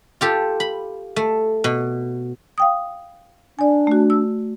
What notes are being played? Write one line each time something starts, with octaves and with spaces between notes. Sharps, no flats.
F4 G4 A4
B5
A3
B2
F5 G5 D#6
D4 D5 G#5
A3 F#4
E6